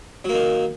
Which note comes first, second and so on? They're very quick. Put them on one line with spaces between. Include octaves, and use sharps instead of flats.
F#3 A#3 D#3